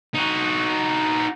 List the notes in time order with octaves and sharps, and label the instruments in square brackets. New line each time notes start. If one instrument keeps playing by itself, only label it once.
[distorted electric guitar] D#4 F#4